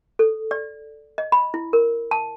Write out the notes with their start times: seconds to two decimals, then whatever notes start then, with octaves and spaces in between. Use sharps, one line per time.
0.19 A4
0.51 D5
1.18 D#5
1.32 B5
1.54 E4
1.73 A#4
2.11 A5